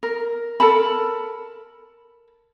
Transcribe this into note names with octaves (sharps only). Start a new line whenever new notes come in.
A#4
A4 A#4 A5 B5